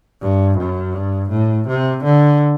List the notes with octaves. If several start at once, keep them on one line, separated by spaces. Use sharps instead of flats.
G2
F#2
G2
A2
C3
D3